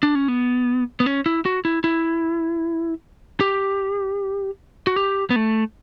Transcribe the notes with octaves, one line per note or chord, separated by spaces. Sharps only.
D4
C#4
B3
B3
C#4
E4
F#4
E4
E4
G4
F#4
G4
B3
A3